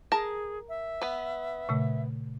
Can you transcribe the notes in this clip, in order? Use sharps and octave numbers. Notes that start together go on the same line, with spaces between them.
G#4 A#4 A5 A#5
E5
B3 B4
A#2 C#3 A3